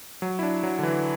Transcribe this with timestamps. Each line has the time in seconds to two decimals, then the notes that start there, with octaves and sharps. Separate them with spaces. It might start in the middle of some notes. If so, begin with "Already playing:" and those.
0.22 F#3
0.39 E4
0.43 D4
0.63 F#3
0.79 D3
0.83 E3